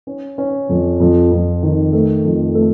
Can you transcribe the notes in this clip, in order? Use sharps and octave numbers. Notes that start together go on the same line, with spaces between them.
C#4
C#4
F2
F2
F2
D#3
A3
F2
A3